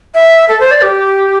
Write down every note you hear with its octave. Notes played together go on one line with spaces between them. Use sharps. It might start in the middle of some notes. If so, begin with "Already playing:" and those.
E5
A4
C5
D5
G4